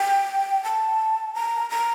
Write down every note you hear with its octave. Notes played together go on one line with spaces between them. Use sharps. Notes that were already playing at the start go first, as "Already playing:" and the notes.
Already playing: G5
A5
A#5
A#5